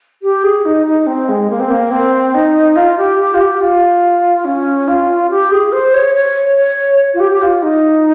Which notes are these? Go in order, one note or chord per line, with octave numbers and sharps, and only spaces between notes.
G4
G#4
D#4
D#4
C4
G#3
A#3
C4
A#3
C4
D#4
F4
G4
G4
F4
G4
F4
C#4
F4
G4
G#4
C5
C#5
C#5
C#5
F4
G4
G4
F4
D#4